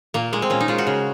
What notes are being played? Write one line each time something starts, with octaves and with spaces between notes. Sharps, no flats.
A#2 A#3
G#3 A#3
C4
A#2 C#4
D#4
G#3 F4
F#4
C#3